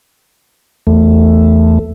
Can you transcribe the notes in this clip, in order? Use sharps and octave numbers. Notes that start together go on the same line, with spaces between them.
E2 A3